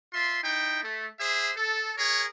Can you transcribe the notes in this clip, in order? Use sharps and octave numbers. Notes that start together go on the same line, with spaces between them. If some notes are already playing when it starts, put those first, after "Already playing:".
F4 E5 C6
D#4 E4 G5
A3
G#4 C5 E5
A4
G#4 A#4 C#5